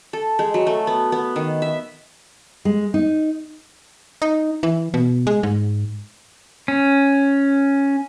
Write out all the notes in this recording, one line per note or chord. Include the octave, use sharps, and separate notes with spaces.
A4
G#3
F#3
A3
B3
B3
D#3
E5
G#3
D#4
D#4
E3
B2
G#3
G#2
C#4